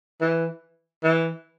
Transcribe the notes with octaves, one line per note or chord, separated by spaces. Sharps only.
E3
E3